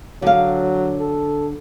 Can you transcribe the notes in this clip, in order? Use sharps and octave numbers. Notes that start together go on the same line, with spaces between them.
D3 F#3 F5
A4